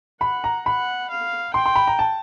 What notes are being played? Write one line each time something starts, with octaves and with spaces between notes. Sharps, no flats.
F#5 B5
A#5
F#5 B5
F5
G5 C6
C6
B5
A#5
A5